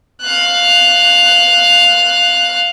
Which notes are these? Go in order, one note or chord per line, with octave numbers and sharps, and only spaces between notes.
F5 F#6